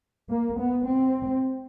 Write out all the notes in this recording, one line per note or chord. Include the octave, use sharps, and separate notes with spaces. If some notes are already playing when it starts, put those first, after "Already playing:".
A#3
B3
C4